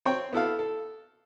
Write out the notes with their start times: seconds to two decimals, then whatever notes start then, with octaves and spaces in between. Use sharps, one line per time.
0.05 C4 C#5 G5
0.33 B3 E4 A4 F5
0.59 A4